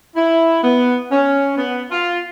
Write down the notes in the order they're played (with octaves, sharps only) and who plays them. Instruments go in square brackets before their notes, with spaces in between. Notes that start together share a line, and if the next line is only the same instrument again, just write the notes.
[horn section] E4
B3
C#4
B3
F4